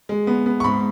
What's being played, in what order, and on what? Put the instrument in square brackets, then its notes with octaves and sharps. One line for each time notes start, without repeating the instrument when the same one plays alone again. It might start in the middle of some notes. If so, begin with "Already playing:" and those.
[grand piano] G#3
B3
B3
C#6
G#2 B5